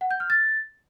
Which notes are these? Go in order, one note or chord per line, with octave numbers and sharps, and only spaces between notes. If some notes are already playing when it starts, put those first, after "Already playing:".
F#5
G6
F6
A6